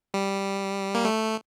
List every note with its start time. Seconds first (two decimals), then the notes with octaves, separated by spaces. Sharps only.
0.14 G3
0.95 A#3
1.05 A3